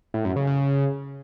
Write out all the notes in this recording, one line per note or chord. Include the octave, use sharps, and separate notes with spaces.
A2
F#2
C#3
C#3